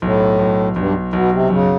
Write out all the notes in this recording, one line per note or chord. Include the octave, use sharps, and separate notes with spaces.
B1 A2
B1
B1 G2
B1 B2
C3
F#2 C#3